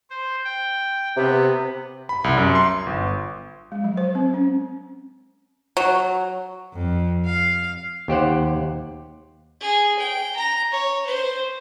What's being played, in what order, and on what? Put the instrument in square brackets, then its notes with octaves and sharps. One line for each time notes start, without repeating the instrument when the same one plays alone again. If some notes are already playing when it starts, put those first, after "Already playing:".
[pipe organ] C5
G5
[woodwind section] C3 [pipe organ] B3
[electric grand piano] B5
C2
F#2
C6
G1
[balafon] G#3
F#3
C5
C4
C#4
[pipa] F#3
[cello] F2
F5
[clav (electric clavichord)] D#2 G4 C5 F#5
[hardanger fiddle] G#4
G5
A#5
C#5
C5